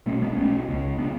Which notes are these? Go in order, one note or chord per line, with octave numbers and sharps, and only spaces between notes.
B1 B2 A3 C#4
G#3 B3
D4
B1 B2 A3 C#4
C#2 C#3
C#3 B3 D4